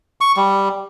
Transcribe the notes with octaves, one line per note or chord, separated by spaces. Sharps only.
C#6
G3